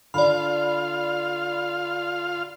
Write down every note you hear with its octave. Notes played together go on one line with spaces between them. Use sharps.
D3 F4 D5 F5 B5